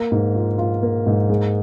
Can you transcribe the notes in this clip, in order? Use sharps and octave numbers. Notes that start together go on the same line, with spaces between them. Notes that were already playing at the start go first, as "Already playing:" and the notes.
Already playing: A#3
G#2
F4
F4
A#3
G#2
G#3